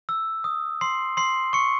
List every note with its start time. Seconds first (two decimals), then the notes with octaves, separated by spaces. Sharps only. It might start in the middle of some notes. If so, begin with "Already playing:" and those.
0.09 E6
0.44 D#6
0.81 C6 C7
1.17 C6 C7
1.53 C#6 C#7